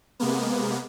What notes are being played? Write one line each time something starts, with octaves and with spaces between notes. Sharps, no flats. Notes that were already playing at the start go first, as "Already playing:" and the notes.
C3 G#3 A#3 B3